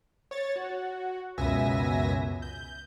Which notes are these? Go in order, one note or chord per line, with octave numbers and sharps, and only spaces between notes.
C#5 A6
F#4
C#2 F#2 B2 E5 G#5 A#6
G6